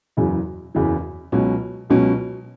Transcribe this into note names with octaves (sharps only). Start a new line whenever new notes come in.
F#1 E2 C#3 F#3
F#1 E2 C#3 F#3
C#2 B2 F#3 C#4
C#2 B2 F#3 C#4